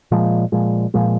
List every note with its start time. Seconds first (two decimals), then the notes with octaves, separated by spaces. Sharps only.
0.11 A#2 F3 G#3
0.52 A#2 F3 G#3
0.94 A#2 F3 G#3